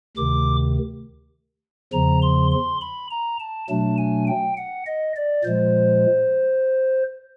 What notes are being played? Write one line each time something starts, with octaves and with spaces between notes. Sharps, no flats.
D2 C3 D#3 D6
E2 C#3 F3 A#5
C6
C6
B5
A#5
A5
B2 F#3 A3 D4 A5
G#5
G5
F#5
D#5
D5
A#2 F3 G#3 C5